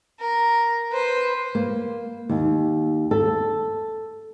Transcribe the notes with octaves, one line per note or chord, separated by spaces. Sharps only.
A#4
B4 C5
A#3
D#2
A4